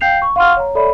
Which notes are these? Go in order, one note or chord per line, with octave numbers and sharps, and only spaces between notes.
F5 G5 G6 C7 F7
C#6
F5 F#5 C6 C#6 F6
C#5 A#5
A4 C#5 D5 E5 B5